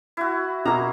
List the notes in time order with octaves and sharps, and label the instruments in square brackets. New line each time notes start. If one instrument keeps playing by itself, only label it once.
[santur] E4 F#4
[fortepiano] B2 A#5 [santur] A#3 C#4